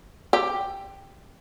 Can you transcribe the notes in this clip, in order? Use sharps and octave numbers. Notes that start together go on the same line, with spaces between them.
G4